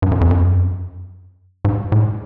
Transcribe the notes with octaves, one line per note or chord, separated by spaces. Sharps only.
G2
F#2
F2
F#2
G#2
A2